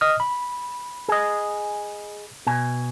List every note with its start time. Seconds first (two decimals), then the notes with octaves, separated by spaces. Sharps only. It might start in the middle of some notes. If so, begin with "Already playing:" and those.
0.01 D#5 D#6 F6
0.20 B5
1.08 G#4 D#5
2.47 B2 G#5